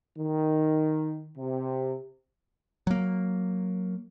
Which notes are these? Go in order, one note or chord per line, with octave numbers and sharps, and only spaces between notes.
D#3
C3
F#3 A#3